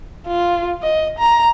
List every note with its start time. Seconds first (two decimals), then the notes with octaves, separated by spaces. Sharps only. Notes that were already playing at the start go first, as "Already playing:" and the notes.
0.28 F4
0.83 D#5
1.19 A#5